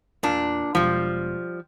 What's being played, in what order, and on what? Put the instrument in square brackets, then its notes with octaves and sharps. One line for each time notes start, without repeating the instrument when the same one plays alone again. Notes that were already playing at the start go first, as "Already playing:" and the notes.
[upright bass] E2 [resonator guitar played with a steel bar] A#2 D4
[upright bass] E1 [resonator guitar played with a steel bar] F3 G3